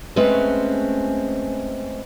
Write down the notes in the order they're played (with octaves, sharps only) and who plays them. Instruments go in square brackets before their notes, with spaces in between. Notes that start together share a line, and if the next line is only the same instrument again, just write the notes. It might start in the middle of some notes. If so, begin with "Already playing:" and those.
[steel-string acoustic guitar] G#3 A3 C4 C#4 B4